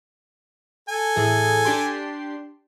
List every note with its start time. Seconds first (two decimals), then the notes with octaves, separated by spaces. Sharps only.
0.89 A4 G#5
1.16 A2 E3 G#4
1.65 D4 G4 C6